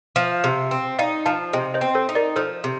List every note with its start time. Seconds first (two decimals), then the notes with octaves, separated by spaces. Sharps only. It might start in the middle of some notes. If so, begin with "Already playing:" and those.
0.16 F3
0.44 C3
0.71 C4
0.99 D#4 D5 F5
1.26 F3 F5 A5
1.53 C3 D#5 G5
1.74 C5 D#5
1.81 C4
1.95 A4 C5
2.09 D#4
2.15 A#4 D5
2.36 F3 A4 C5
2.64 C3